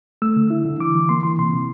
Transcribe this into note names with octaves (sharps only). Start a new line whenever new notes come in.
A3 E6
D3
E4
D3
E3 D6
E3
A#3 C6
E3 C6
C3 C6
C3